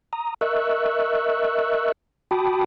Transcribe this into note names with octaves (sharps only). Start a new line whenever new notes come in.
A#5 D#6
A#4 D#5 E5 C#6 E6 F#6
F#4 G5 A5 B5 D6 D#6